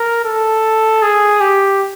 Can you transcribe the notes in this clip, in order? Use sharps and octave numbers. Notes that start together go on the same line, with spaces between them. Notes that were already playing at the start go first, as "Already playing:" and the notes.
Already playing: A#4
A4
G#4
G4